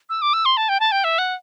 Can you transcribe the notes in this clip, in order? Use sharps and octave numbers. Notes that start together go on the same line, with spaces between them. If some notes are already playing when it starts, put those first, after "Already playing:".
E6
D6
E6
C6
A5
G5
A5
G5
E5
F#5